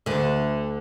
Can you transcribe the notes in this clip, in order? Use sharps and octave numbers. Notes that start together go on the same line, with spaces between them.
D2 D3